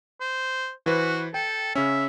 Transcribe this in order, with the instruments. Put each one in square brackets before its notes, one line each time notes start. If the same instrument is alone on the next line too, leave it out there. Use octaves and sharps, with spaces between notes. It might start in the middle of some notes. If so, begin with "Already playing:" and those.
[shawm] C5
[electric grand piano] E3 B4 C5 [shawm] F#4
[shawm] A4 [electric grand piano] G5
[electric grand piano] C#3 C#4 [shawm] E5